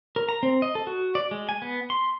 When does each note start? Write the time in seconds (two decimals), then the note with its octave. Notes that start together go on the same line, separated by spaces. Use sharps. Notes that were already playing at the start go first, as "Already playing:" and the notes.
0.16 A#4
0.29 A#5
0.43 C4
0.62 D#5
0.75 A4
0.87 F#4
1.15 D5
1.31 G#3
1.49 G#5
1.62 B3
1.90 C6